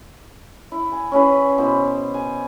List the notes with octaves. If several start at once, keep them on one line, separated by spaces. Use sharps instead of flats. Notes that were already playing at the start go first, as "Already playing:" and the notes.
E4
G#5
C#4 E4 G#4 B4
B2 E4 C5
G#5